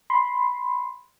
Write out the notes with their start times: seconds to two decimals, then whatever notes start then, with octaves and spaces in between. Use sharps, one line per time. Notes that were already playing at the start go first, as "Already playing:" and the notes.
0.10 B5 C6